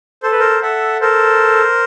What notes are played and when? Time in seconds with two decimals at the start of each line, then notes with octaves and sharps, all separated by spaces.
0.23 A4 C5
0.31 B4
0.39 A#4 C5
0.62 A4 E5 F#5
1.01 A4 A#4 C5